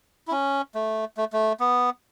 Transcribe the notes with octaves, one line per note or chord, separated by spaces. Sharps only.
E4
C#4
A3
A3
A3
B3